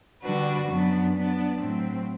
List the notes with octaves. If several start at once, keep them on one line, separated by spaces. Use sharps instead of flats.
D3 G3 D4 F#4 B4
F#2 F#3 B3 D4
F#3 B3 D4
A2 F#3 C4